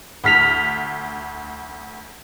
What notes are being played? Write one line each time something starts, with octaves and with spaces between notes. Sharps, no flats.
D2 F6 B6 F7